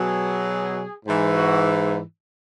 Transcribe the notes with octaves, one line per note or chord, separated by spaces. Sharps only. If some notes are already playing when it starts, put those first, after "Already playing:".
Already playing: B2 F#3 G#4
G#2 E3
F#4